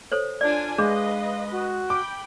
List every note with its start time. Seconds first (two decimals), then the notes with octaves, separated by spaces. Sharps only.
0.12 A4 C5 C#5
0.41 D4 F4 D5 G#5
0.78 G#3 D4 G#4 B4 D#5 F5
1.52 F#4
1.90 G5 B5 D6